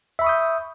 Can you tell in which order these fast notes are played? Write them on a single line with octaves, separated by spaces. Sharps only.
E5 B5 C#6 D#6 G6